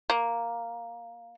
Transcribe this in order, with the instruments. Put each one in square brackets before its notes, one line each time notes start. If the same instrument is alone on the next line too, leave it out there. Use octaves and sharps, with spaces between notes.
[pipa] A#3